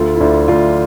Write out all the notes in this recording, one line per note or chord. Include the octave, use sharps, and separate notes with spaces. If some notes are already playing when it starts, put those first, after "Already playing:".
Already playing: D2 F4 A4
E4
D2 D4 F4
D2 D4 F4